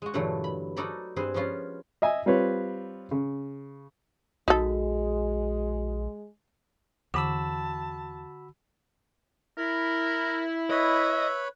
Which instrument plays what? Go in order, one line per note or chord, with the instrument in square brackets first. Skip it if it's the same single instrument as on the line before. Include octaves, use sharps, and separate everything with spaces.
[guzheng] G#3 F#4
G2 A#2 D3 E3 F#3 A3
B5
D#4 F#4 A4 D5 A#5 B5
G2 C4 G#4 B4 C5
F3 B3 C#4 F4
[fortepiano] D#5 E5 G#5
G3 C4 F4 B4 C#5
C#3
[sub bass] A#1 [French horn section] G#3 [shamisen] D#4 A4 [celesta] F#4
[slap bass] E2 [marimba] D3 D6 [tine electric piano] F#4 B5 E6 [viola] A5
[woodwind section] E4 [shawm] A#4
[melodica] B4 C#5 B5 [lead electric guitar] D#5 [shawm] E5